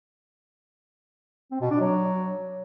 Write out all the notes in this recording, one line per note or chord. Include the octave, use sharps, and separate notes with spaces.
C4
B2
D4
F#3